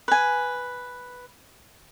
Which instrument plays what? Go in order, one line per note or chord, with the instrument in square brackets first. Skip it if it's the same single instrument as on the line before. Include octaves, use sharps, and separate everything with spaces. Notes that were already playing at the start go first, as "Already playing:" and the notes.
[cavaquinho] B4 G#5